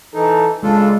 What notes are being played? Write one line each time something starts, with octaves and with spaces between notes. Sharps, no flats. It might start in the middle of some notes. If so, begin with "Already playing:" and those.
E3 D#4 A4
C#3 G#3 D4 F4 A4